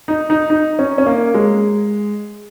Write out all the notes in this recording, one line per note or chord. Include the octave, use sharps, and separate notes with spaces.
D#4
D#4
D#4
C#4
C#4
A#3
G#3